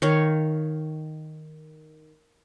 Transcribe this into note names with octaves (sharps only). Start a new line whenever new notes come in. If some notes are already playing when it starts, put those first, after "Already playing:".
D#3 C#5 F5